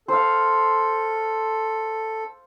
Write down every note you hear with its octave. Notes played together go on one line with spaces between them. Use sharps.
A4 C5 F5